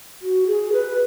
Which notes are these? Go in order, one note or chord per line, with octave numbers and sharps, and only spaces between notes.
F#4
G#4
B4